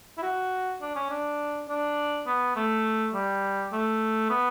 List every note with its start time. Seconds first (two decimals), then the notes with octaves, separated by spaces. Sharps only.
0.18 E4
0.23 F#4
0.82 D4
0.96 C#4
1.10 D4
1.69 D4
2.26 B3
2.56 A3
3.14 G3
3.73 A3
4.30 B3